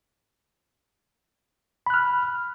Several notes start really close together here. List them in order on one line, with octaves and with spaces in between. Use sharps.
B5 F#6 F6